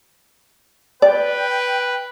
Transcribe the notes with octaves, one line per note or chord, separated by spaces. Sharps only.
B4 D5 G5